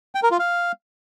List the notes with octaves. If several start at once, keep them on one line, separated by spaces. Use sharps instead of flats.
G5
A#4
F4
F5